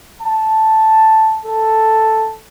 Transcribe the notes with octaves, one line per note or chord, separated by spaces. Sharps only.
A5
A4